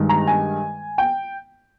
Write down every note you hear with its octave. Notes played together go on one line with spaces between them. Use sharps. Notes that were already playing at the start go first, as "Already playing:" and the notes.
Already playing: G2 D#3 G#3
A#5
G#5
G5